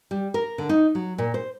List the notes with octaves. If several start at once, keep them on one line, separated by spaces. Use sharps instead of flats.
G3
A#4
D3
D#4
F#3
A#2
C5